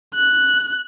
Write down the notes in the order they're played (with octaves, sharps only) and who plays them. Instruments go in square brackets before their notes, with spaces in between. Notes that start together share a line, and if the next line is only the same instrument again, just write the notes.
[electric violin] F#6